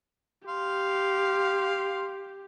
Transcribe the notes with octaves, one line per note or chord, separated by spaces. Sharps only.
G4 F5 C6